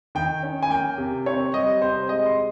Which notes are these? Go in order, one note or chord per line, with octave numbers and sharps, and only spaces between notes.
D#3 G5
C#4
G#5
A#3 G5
C3
C4 C#5
G3 D#5
C3 C5
G#3 D#5
C6